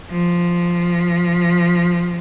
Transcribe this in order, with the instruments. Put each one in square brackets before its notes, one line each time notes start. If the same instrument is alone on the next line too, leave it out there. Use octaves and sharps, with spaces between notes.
[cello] F3